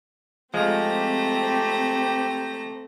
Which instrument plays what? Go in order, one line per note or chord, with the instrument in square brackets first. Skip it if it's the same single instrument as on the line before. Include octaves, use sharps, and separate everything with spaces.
[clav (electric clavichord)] F3 G#3 [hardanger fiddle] A3 A#5 [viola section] C4 [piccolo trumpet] G4